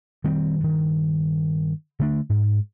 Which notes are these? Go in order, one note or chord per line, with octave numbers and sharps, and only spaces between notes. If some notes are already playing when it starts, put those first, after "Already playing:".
D#3 G3 C4
G2 D#3
D3 A3 D4
G#2